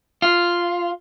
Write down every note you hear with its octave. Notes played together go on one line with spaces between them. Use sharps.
F4